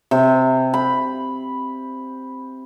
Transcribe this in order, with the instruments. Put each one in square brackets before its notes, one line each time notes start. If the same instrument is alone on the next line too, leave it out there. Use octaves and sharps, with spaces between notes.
[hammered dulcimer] C3
B5